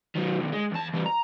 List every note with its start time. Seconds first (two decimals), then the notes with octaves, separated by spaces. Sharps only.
0.16 D#3 F#3
0.39 B1 D#3
0.52 G#3
0.71 E2 A5
0.93 E3 G3
1.06 A#5